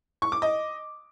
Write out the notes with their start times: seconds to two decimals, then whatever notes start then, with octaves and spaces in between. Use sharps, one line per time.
0.22 C#6
0.32 D6
0.42 D#5